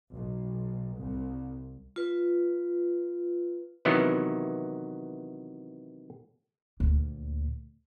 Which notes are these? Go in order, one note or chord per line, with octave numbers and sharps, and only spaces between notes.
B1
C2
F4 B4
C3 D#3 E3 F#3 B3 E4
D2 A#2